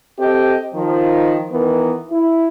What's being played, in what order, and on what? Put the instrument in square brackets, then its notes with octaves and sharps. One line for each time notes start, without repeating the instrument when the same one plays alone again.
[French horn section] C4 G4 A4 D#5
D#3 F3
D#3 E3 B3 A#4
E4